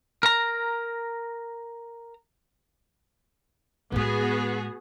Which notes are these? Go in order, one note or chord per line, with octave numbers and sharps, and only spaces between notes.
A#4 A#5
A2 G#3 B3 F#4 G#4